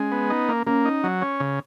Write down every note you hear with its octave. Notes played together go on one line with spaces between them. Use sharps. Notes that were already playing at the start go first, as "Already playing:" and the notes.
Already playing: G#3 C#4
B3
D#4
A#3
A#3 C#4
D#4
F#3
C#4
C#3